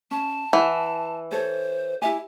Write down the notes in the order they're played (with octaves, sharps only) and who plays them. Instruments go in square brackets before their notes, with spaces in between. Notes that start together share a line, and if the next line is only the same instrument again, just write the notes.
[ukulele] C#4 [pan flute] A5
[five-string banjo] E3 [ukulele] F#5
[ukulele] A4 C#5 [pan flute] C5
[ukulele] E4 E5 G#5 [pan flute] G4